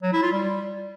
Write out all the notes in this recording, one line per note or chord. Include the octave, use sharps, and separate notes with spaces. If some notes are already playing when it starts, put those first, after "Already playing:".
F#3
E4
F4
G3